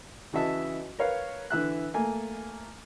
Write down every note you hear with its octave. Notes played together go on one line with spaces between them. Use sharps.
C#3 E3 F#4 D#5 E5 A5
A#4 B4 C#5 F5
D3 E3 E5 F#6
A3 A#3 G#5